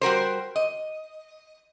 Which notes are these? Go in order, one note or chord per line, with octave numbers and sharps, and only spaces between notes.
G3 F#4 A#4 C5
D#5